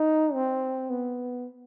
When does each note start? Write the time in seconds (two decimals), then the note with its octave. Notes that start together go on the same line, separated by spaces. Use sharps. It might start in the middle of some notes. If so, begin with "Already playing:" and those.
Already playing: D#4
0.33 C4
0.90 B3